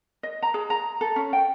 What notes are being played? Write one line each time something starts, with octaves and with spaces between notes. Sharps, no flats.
D#5
A#5
G#4
A#5
A4
C#4
G5